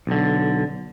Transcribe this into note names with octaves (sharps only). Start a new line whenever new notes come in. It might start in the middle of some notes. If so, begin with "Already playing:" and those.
B1 D3